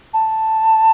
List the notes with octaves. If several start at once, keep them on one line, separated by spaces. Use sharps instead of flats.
A5